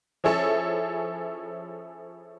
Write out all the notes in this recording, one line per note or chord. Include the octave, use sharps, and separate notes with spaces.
F3 C#4 E4 G#4 A4 C#5